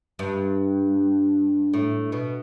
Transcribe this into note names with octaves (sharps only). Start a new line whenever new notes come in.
G2
A2
B2